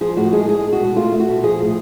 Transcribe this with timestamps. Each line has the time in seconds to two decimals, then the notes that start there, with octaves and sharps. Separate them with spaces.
0.01 F3 G#4
0.17 A2 F#4
0.33 G#3 G#4
0.48 G#3 G#4
0.64 G#3
0.73 F#4
0.80 B2
0.96 A3 F4
1.12 A3
1.20 F#4
1.29 B2
1.43 F3 G#4
1.60 A2